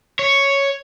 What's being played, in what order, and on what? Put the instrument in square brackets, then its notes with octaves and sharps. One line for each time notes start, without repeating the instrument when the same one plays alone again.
[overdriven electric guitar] C#5